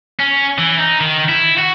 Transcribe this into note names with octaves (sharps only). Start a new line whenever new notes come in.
C#4
E3
D#4
D#3
E4
F#4